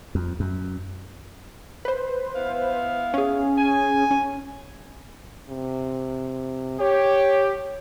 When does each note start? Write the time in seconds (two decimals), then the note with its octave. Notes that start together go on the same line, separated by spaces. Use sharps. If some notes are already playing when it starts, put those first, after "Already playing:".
0.15 F2
0.40 F#2
1.85 B4 C5
2.36 B3 E4 F5
3.14 C#4 G#4
3.58 G#5
4.11 C#4
5.49 C3
6.80 G4 C#5